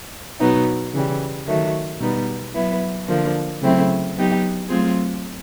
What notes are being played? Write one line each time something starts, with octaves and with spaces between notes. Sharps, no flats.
B2 F#3 B3 D#4
C#3 E3 G3
D#3 F#3 A3
B2 G3 B3 D#4
F#3 B3 E4
D3 F3 A#3 D4
C#3 F#3 A3 C4 E4
F#3 B3 D#4 G4
F#3 A3 C4 F4 G#4